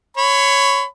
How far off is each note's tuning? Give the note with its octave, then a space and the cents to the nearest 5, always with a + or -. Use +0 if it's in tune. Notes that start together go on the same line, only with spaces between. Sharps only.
C#5 +0 B5 +25